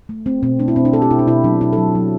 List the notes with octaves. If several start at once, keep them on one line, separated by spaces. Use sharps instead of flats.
A3
A3 C4
B2 C4
A3 D4
E4
B2 C4
D4
B2 A4
G4
B2 E4
D4
B2 E4
F#3 D4
B2 E4
A4
F#3
F#3